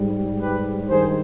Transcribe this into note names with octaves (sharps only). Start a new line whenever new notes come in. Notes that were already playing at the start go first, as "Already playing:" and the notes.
Already playing: G#2 G3
G4 B4
G2 D#3 G#4 C5